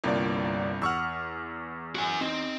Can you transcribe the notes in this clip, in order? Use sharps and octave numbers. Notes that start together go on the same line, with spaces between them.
G1 C2 G2 A#3 F4 D5
E2 F#5 C#6 E6 F6
F#4 G#5
C4 D#4